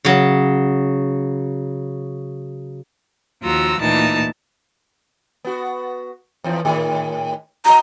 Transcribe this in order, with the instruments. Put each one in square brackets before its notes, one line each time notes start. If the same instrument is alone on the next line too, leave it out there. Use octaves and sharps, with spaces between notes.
[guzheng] C#3 F#3
[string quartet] D#2 F3 F4 F#4 A#5 E6
D2 A#2 E3 A#3 D#4 A5
[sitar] B3 F#4
E2 E3 F3
A2 D#3 G#4
[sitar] F#4 D#5 [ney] A#5